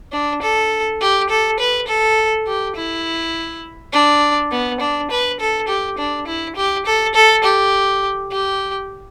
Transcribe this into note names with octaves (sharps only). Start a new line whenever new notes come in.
D4
A4
G4
A4
B4
A4
G4
E4
D4
B3
D4
B4
A4
G4
D4
E4
G4
A4
A4
G4
G4